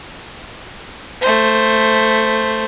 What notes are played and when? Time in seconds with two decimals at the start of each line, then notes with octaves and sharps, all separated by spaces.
1.21 A3 C5